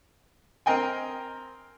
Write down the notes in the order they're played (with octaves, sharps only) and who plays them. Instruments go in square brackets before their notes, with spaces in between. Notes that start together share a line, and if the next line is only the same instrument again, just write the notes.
[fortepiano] C4 A#4 D#5 G5 G#5